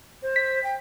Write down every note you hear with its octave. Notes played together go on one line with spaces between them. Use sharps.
C5
B6
G5